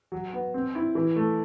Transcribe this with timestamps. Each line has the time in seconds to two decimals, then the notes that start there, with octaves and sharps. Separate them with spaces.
0.12 F#3
0.33 B3
0.54 C4
0.75 E4
0.95 E3
1.16 A3